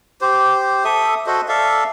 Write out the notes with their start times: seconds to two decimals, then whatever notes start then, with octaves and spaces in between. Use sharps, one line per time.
0.21 G4 C5
0.85 A4 E5 D#6
1.26 F#4 A4 C5 D#5
1.49 A4 D5 E5 F5